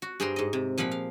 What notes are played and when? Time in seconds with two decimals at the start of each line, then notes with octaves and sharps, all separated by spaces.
0.02 F#4
0.20 G2 G#4 C5 G5 A#5 C6
0.36 G#2 D#5
0.53 C3
0.78 A#2 F3 F5 F#5 B5
0.91 F5